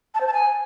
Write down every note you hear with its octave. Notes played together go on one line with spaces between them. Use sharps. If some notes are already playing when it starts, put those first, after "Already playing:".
A5
C5
A5
G#5